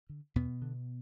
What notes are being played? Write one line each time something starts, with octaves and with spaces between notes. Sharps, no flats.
D3
E2 B2 B3
D3